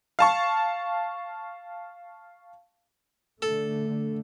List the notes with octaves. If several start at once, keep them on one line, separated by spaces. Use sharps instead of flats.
F5 A5 C#6
D3 A3 A4